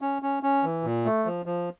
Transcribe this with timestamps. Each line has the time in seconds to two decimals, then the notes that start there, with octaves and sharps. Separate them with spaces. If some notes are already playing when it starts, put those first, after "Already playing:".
0.01 C#4
0.22 C#4
0.43 C#4
0.64 E3
0.84 A#2
1.05 A3
1.25 F3
1.46 F3